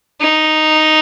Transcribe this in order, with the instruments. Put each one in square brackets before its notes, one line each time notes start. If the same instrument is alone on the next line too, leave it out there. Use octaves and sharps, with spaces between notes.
[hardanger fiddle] D#4